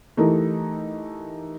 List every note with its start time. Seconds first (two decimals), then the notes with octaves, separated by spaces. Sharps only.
0.17 E3 A3 D#4 G4 A#4